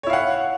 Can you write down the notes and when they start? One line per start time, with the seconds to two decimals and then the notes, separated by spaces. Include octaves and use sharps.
0.03 C#5
0.07 E4
0.10 F5
0.13 F#5